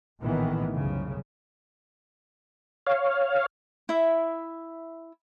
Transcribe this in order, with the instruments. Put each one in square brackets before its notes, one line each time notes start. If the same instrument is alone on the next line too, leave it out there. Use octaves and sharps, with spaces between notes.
[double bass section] A#1 A2 D#3 E3 B3
C2 F#2 C#3
[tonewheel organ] C#5 F5
[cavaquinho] E4 E5